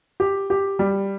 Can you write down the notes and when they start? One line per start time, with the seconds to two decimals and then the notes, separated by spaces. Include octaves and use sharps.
0.20 G4
0.50 G4
0.79 G3